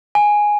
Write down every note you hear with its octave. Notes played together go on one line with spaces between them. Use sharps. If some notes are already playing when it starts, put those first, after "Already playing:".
G#5